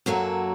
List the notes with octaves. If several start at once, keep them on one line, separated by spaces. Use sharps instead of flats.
F#2 F#3 A#3 F#4 A4